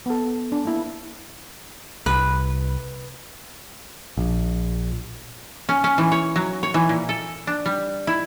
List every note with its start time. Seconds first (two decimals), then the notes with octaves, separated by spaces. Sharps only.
0.06 B3 A4
0.52 D4
0.65 A#3 E4
2.06 C2 B4
4.17 A#1
5.69 C#4
5.84 C#4
5.98 E3
6.12 C#5
6.36 F#3
6.63 C#5
6.74 E3
6.89 A#2
7.09 A4
7.47 D4
7.66 G3
8.07 E4